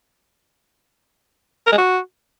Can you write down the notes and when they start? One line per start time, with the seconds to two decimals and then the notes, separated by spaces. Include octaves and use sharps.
1.67 A#4
1.72 G#3
1.78 F#4